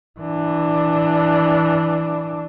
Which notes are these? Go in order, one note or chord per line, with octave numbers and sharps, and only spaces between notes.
E3 D4